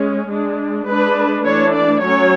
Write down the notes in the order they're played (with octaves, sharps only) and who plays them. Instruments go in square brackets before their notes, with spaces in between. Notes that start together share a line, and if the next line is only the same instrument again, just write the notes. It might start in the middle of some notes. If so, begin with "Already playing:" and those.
Already playing: [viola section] G#3 C#4
G#3 D4
G#3 D4 B4
E3 A3 D4 C#5
D5
F#3 C#4 C#5